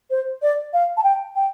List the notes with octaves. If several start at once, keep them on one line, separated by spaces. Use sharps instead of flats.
C5
D5
F5
A5
G5
G5